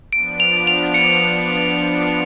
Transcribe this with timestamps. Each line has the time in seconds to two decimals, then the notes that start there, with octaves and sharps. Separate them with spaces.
0.12 F3 B3 D4 D7
0.40 F7
0.67 F7
0.94 C#7